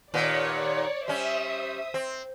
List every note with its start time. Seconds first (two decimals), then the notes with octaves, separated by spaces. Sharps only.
0.14 D#2 A#2 B3 C#5 D5
1.08 G3 C#4 C5 E5 D#6
1.94 C4